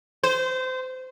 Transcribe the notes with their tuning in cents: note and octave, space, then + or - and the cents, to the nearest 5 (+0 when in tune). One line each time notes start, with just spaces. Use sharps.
C5 -25